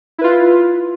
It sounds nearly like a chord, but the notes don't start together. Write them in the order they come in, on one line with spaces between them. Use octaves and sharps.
E4 B4 F4